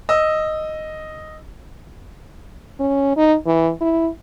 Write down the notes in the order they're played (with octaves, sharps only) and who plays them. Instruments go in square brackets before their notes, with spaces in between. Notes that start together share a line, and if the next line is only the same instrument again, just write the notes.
[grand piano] D#5 E6
[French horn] C#4
D#4
E3
E4